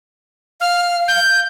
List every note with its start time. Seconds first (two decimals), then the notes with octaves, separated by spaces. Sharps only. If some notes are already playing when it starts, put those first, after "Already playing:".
0.61 F5 F6
1.08 G6